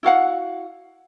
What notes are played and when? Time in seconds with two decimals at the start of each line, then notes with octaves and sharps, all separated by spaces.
0.03 E4 F#4 F5 F#5